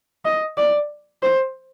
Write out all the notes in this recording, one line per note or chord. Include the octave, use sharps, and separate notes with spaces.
D#5
D5
C5